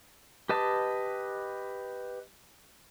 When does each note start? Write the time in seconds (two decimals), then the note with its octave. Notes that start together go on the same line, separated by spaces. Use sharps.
0.49 G4 B4 D#5 A5